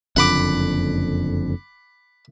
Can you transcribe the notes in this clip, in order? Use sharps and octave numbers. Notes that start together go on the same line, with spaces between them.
F#1 F2 D3 F#5 B5 D6